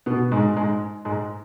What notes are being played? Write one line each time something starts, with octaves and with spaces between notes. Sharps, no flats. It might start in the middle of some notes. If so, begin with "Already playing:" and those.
B2 B3
G#2 G#3
G#2 G#3
G#2 G#3